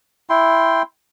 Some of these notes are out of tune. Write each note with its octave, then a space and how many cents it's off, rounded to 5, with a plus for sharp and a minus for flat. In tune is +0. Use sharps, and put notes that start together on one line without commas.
E4 +0 G5 +0 C6 +0